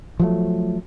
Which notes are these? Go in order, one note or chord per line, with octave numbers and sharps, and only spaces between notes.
F3 F#3 A3